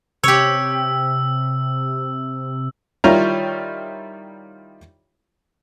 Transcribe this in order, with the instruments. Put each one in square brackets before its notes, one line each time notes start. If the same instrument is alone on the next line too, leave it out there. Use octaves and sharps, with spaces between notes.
[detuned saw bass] C3 [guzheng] G4 C#5 [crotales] E6
[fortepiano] D#3 G3 E4 F4 C#5 A#5